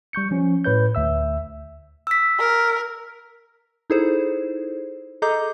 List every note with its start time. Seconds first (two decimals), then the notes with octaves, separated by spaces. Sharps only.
0.13 G3 C#6 G6 C#7
0.31 F3 C#4
0.64 A2 B4 C#5 G6
0.95 D2 E5 E6
2.07 E6 B6
2.39 A#4
3.90 D#4 E4 G#4 A4 C5
5.22 G#4 A4 D#5 A#5 D6 G6